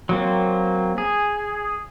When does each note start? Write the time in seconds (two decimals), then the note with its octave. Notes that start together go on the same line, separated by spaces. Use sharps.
0.09 F#3 A#3 C4
0.98 G#4